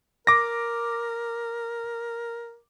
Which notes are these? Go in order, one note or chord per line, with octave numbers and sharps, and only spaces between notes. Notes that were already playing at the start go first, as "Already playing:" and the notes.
A#4 D6 A#6